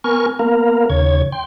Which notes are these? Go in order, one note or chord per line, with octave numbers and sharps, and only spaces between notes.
B3 A#4 G#5 C#6 F6
A#3 B3 A#4 F5
D#2 C#3 C#5 G#6
G5 C6